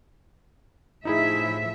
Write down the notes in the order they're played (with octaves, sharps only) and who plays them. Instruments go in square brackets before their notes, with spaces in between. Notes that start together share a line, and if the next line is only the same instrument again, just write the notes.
[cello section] A2 F3 E5 [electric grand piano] D#4 E4 G#4